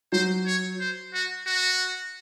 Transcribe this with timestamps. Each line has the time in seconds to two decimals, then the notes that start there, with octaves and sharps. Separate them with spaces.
0.12 F#3 C5
0.46 C#5
0.80 C5
1.14 F#4
1.47 F#4